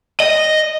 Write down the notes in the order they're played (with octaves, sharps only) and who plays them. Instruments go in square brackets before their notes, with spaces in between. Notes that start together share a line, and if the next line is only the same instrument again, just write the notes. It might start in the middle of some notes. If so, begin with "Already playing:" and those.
[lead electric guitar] D#5